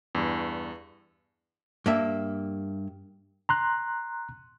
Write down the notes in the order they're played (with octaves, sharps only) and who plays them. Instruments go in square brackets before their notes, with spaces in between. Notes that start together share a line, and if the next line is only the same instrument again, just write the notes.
[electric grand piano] E2 G2
[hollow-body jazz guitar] G2 A#3 E5
[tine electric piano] A#5 C6 F#6